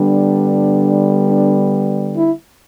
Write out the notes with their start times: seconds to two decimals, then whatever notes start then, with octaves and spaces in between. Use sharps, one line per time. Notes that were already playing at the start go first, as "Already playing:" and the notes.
Already playing: D3 G3 B3 D4
1.28 D4
2.16 E4